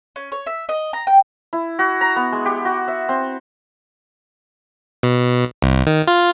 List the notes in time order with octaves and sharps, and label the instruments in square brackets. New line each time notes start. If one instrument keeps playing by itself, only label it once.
[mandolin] C#4
C#5
E5
D#5
A#5
G5
[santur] E4
F#4
A#5
B3
G#3
G4
F#4
E5
C4
[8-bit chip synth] B2
C2
D#3
F4